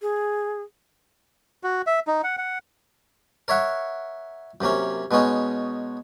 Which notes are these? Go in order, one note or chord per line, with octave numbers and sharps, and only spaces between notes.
G#4
F#4
E5
D#4
F#5
F#5
A#4 C#5 E5 F#5
F#2 C3 A#3 C#4
B2 G#3 B3 C#4 D#4